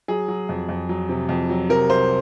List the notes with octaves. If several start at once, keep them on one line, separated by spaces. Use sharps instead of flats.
F#3 G#4
F#3
F2
F2
F#3
C3
F2
F#3
C3 A#4
C2 C5